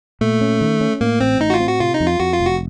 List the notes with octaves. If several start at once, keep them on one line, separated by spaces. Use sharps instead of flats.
A#2 A3
C#4
D#3
C#4
A2 A#3
A1 C4
A2 D#4
F#4
F4
C4
F#4
C3 F4
D#4
F2
F4
F2 F#4
F4
F1
F#4